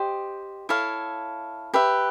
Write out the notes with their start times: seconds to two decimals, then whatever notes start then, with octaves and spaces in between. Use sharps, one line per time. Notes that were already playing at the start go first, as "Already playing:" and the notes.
Already playing: G4 C5 D#5
0.69 E4 A4 C#5 F5
1.74 G4 B4 E5